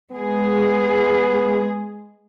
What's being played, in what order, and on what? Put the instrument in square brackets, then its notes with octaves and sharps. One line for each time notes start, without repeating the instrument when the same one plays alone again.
[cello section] G#3 G#4 [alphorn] B3